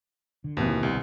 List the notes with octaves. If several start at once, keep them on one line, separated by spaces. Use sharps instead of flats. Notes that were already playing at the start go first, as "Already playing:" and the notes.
D3
G#1 D#2 B2 E3
C2